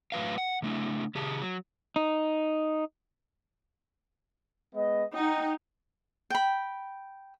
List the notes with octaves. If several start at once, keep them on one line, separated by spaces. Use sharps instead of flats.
A2 F#3 B4 F5
F#5
C#3 A3 D4 E4
C#3 G4 G#4 A5
F#3
D#4
G#3 B3 D#5
D#4 F#5 G5
G5 B5